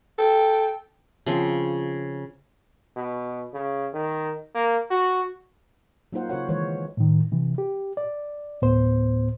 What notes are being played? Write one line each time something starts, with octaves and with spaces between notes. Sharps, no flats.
A4 G5
C#3 F3 C4
B2
C#3
D#3
A#3
F#4
F#3 A#3 D#4 F4 C5 F#5
C#3 F4 F#4 C5 C#5 F#5
D#3 E3 G#3 C5 C#5
A2 D#3
C3 E3
G4
D5
D2 A2 B3 C5